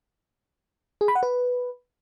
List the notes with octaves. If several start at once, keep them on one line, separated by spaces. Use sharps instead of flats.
G#4
B5
F#5
B4